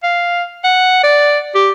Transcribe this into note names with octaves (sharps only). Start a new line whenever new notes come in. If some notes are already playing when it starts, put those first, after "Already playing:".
F5
F#5
D5
G4